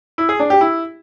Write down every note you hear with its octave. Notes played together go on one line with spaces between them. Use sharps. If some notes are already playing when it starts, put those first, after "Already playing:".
E4
G#4
D4
G4
E4